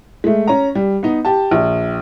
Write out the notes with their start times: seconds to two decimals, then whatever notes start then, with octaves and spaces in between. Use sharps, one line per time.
0.24 G#3 A3
0.48 C#4 A#5
0.75 G3
1.03 B3 D#4
1.25 G4 A5
1.51 A#1